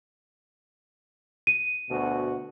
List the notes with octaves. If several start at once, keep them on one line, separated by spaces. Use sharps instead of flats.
D#7
D2 B2 F#4